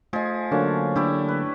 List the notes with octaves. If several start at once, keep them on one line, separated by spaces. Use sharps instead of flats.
F3 A3 G#4 D#5
D3 F#3 A#3 C#4 D4
A3 D4 E4 G4
B4